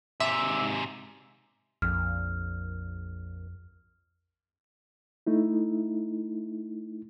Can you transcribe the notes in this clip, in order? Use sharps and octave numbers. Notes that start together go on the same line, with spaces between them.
G#2 C3 E5
A#1 F2 F6
A3 D#4 E4